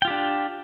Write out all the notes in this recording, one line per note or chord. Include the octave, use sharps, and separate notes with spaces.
D4 F4 G4 G5